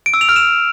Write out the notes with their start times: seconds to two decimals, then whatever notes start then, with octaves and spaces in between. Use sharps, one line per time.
0.06 D7
0.14 E6
0.21 F7
0.29 F6
0.36 E7